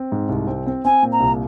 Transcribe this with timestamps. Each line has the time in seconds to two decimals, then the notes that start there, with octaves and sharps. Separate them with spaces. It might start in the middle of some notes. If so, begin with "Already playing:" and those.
Already playing: C4
0.12 G#2
0.29 C2
0.47 C4
0.67 C4
0.84 C4 G#5
1.03 A#2
1.12 A#5
1.20 C2